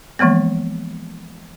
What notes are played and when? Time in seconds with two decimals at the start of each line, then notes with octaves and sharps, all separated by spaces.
0.19 E3 F3 G#3 A#3 B3